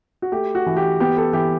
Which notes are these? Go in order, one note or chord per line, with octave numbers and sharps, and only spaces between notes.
F#4
A3 G4
F#4
E3
G4
B3 G4
A4
E3 G4